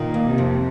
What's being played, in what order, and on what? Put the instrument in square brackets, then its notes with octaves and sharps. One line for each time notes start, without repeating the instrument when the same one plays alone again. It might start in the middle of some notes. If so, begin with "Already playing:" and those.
Already playing: [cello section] A#2 [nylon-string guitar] D#3
[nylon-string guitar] A#3
[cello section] C3
[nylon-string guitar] F2